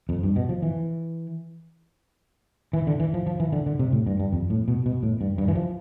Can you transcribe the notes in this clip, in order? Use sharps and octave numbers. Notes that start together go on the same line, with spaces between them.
F2
G2
B2
F3
E3
E3
D3
E3
F3
F3
E3
D3
D3
C3
A2
G2
G2
F2
A2
B2
B2
A2
G2
G2
E3
F3